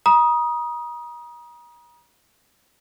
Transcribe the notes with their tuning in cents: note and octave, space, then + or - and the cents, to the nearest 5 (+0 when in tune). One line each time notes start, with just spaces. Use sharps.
A#5 +40 D#6 +0